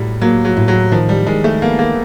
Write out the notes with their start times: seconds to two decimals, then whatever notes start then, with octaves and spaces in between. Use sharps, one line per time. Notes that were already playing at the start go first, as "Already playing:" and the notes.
Already playing: A2 F#3 G3
0.21 F#3 A#3
0.45 F#3
0.57 A2
0.68 F#3
0.92 D#3 F3
1.09 G3
1.26 D#3 G#3
1.44 A3
1.62 A#3 B3
1.79 A#3